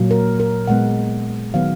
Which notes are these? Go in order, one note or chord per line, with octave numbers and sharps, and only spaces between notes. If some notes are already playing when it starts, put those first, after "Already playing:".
Already playing: A#2 F#3 A#3
A#4
A#4
A#2 G#3 B3 F#5
D#3 F#3 B3 F5